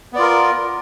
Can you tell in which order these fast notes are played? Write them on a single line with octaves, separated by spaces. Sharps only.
B3 D5 F4 A#4